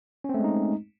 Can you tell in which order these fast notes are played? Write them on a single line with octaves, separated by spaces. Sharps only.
C#4 C4 A3 G#3 D#4